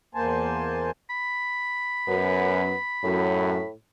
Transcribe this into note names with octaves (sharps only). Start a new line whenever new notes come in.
E2 A#3 C5 G#5 A5
B5
F#2 B3
F#2 A2